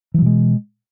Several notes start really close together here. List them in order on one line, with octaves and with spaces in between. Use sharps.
E3 F#3 B2 G#3